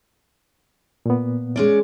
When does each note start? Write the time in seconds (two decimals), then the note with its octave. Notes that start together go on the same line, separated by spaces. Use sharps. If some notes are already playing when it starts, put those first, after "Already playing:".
1.06 A#2 B3
1.56 G#3 C#4 D5